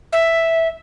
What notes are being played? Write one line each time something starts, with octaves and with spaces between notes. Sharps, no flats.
E5